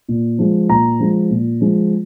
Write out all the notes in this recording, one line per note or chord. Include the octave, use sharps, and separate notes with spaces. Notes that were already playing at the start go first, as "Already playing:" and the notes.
A#2
F3 G#3
A#2 A#5
F3 G#3
A#2
F3 G#3